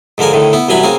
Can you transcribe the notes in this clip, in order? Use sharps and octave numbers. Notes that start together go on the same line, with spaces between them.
G#2 D3 F3 A#4 G#5
A2 D3 D#3
B3 E4
C2 F#2 E3 F#3 G#5 B5
C#3 A#3 C4 G#5